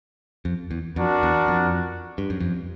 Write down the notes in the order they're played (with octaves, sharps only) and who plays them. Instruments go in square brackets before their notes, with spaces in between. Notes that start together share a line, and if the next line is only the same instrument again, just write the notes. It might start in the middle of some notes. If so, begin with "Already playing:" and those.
[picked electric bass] F2
E2
[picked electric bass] F2 [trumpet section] D4 F#4 A#4
[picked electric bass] E2
F2
G2
F#2
F2